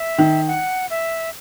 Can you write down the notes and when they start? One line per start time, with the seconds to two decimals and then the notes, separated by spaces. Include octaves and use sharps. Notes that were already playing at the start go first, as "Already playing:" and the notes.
Already playing: E5
0.18 D#3
0.47 F#5
0.90 E5